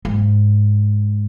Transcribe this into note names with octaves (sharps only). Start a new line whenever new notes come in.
G#2